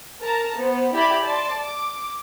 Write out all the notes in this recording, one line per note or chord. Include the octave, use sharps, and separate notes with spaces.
A#4 A5 A#5
B3 C5
E4 G4 D5 E5 B5
D5 A5 C6
D6